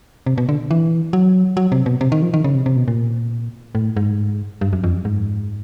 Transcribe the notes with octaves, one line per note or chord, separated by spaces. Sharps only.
C3
B2
D3
E3
F#3
F#3
C3
B2
C3
D#3
F3
D#3
C#3
C3
C3
B2
A#2
A2
G#2
G2
F#2
F2
F#2
G#2